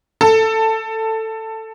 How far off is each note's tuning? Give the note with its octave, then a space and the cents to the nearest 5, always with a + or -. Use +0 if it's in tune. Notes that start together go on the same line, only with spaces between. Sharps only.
A4 +10